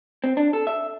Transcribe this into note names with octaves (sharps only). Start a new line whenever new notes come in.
C4
D4
A4
E5